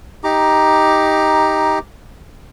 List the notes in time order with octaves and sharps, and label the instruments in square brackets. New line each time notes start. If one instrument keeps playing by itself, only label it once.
[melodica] D#4 G4 A#5 D6